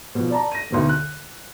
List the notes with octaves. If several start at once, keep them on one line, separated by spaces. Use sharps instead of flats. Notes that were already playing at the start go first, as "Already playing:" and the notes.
B2 F3
D5 A5 A#5
A#6 D#7
D2 B2 D#3
F#6